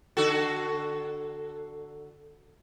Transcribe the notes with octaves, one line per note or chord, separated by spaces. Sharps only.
D3 F#4 A4